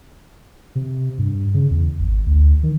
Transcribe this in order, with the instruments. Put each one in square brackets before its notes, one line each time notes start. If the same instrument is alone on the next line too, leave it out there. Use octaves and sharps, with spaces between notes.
[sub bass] C3
G2
C#3
E2
G#1
D2
D#3